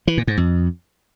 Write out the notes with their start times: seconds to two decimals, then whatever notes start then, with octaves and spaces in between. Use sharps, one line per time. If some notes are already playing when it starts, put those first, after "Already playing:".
0.07 E3
0.17 A#2
0.27 G#2
0.37 F2